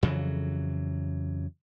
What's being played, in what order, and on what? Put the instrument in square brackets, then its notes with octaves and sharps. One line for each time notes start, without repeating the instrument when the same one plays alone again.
[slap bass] F2 C#3 E3 F#3